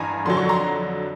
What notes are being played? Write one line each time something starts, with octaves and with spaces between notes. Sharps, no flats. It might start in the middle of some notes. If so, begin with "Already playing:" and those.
Already playing: A1 G2 E3 G#5 A#5
F2 D3 F#3 C6
C#6
A#5 C6